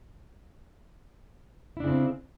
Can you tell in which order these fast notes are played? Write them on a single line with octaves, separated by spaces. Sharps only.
E4 D4 C#3 C4